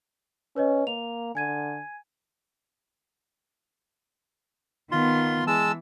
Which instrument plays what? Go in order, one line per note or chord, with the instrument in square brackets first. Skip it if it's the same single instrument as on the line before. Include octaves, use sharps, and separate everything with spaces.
[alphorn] C#4 [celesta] B4 C#5 D#5
[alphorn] A#3 [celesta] F7
[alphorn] D3 [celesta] G#5 G#6 D#7
[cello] D#3 B3 [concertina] F4 C6
[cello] E3 [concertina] G#3 A5 E6